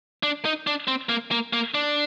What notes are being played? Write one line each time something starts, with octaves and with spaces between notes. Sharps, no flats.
D4
D#4
D4
C4
A#3
A#3
A#3
D4